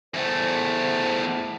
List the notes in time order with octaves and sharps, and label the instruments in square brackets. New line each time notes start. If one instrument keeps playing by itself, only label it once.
[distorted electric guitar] E2 A3 [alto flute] C5